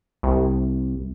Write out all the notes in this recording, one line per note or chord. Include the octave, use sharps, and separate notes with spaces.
C2